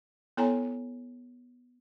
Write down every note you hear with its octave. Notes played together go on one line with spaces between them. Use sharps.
B3 E4 A4 C#5 G#5 A#5